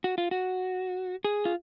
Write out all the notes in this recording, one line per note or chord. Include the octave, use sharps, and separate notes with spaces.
F#4
F4
F#4
G#4
F4